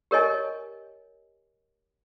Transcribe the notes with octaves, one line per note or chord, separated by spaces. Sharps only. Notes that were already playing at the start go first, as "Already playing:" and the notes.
G4 A#4 C#5 D#5 G#5